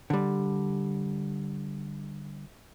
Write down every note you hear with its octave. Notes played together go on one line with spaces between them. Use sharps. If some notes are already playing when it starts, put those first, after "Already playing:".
D3 G3